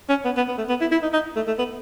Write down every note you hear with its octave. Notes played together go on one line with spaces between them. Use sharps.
C#4
B3
B3
B3
A3
B3
E4
E4
D#4
D#4
A3
A3
B3